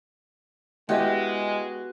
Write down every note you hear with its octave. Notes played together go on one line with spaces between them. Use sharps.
G#3 B3 E4 F#4 G4 D#5